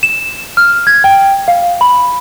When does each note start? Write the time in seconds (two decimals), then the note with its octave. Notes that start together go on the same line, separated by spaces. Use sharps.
0.03 E7
0.57 F6
0.87 G#6
1.04 G5
1.48 F5
1.81 B5